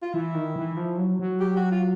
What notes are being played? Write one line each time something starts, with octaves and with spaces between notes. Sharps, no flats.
F4
E3 E4
D#3
E3
F3
F#3
F#3
G4
F#4
F4